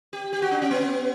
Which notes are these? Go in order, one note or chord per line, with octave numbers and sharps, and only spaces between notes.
G4
G4
F#4
D4
C#4
B3